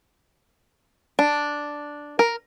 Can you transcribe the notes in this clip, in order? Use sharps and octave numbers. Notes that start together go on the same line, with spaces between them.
D4
A#4